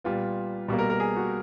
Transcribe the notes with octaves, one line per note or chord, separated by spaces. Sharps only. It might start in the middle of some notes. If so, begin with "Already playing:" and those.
A#2 G3 B3 F4
B2 G3 A#3
A#4
A#4
G#4
F#4